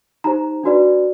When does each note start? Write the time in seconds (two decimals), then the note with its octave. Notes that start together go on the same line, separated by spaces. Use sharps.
0.24 D#4 G4 C5 A#5
0.63 D4 F#4 B4 D5